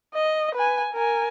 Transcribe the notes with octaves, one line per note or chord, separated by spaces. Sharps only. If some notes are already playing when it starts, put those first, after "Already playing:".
D#5
B4 G#5
A#4 G#5